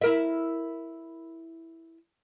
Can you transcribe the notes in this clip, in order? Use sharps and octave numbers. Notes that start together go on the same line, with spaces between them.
E4 A#4 E5